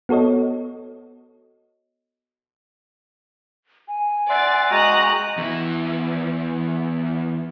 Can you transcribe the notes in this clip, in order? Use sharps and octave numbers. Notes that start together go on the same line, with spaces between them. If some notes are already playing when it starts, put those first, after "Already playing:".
B3 F#4 A4 C#5 D#5
G#5
D5 E5 F#5 C6 A6
G#3 F#4 G5 A#5 D#6 F#6
E2 E4